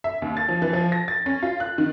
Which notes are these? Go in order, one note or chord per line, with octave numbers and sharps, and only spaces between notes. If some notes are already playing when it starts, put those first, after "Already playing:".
E5
D#2
A6
F3
E3
F3
A#6
A6
C#4
F4
F#6
D#3